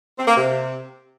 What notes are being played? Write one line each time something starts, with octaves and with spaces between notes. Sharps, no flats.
C4
A#3
C3